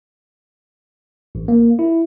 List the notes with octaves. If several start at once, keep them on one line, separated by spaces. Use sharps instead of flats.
A1
A#3
E4